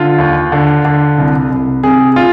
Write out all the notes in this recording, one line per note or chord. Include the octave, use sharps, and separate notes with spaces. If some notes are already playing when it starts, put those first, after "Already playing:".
Already playing: D3 F4
D#2
D3
D3
C2
C2
C3 G#4
F4